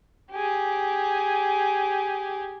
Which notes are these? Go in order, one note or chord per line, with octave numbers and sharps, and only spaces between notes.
G4 G#4